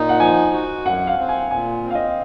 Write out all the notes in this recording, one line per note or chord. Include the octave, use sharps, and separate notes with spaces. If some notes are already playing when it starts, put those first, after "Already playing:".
Already playing: A#2 D#4
F#5
F3 G#5
F#4
F#2 F#5
F5
C4
G#5
A#2 G#5
C4
F5
D#5